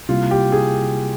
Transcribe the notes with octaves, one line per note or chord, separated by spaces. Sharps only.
C3 G3 A#3 E4 F4
G4
G#4